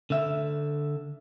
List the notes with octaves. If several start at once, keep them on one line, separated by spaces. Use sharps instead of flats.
D3 E5